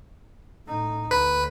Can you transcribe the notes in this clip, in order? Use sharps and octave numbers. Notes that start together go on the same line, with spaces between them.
A2 D#4
D2 B4